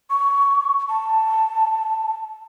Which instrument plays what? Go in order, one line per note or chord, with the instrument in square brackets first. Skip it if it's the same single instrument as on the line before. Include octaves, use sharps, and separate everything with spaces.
[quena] C#6
A5